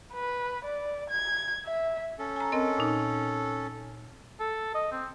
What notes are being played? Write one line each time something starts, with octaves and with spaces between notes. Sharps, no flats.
B4
D5
G#6
E5
C#4 A4
G#5 A#5
C4 A#4 D#5
A#2 D#4
A4
D#5
C4